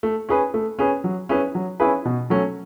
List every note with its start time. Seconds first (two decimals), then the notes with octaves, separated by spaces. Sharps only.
0.03 A3
0.29 C#4 G#4 B4
0.54 A3
0.79 C#4 G#4 B4
1.04 F#3
1.29 C#4 E4 G#4 B4
1.55 F#3
1.80 C#4 E4 G#4 B4
2.05 B2
2.30 F#3 A3 C#4